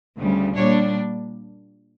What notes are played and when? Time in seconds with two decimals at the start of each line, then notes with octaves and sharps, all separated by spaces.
0.17 D2 C#3 G3
0.55 A#2 G3 D4 C#5